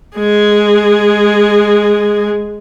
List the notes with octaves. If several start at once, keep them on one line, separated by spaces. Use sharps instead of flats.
G#3 G#4